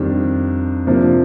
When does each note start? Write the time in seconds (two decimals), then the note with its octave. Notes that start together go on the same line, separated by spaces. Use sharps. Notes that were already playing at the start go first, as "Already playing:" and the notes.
Already playing: F2 D#3 G3 D4
0.87 C3 F3 A#3 D4